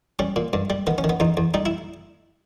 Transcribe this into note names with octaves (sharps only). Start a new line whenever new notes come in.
G3 C#4
A#2
G2
G3
D#3 B3
C#4
D#3
B3
E2 D#4
E2
G3 D#4
E4